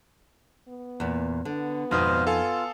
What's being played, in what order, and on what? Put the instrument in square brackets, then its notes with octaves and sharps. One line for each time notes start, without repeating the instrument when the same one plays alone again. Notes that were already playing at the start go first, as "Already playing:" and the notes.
[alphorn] B3
[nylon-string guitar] E2 A#2
[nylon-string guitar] D3 [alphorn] B3
[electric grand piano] G#1 B2 D#6 [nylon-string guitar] F2 D#4 [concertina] C5 F5
[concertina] F4 [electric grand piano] A4 F5 G#5